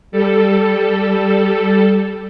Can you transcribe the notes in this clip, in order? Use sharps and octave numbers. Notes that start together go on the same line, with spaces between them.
G3 A4